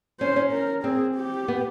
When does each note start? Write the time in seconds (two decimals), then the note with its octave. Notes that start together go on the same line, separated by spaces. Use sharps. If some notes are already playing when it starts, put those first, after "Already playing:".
0.20 C#4 C5
0.36 C#4
0.52 A#4
0.84 C4 G#4
1.16 G4
1.48 B3